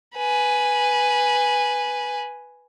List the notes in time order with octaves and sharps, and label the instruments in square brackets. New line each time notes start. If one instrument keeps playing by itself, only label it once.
[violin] B4 G#5